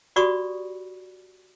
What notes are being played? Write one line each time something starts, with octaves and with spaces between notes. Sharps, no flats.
F#4 G4 D5 B5 C#6 D#6